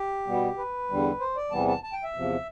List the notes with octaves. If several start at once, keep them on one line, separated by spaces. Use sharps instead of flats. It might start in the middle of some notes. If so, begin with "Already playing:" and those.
Already playing: G4
B2 G3 B3
B4
E2 D3 G3
C5
D5
E2 C3 E3 G3 B3 A5
A5
A5
G5
E5
E2 C3 F3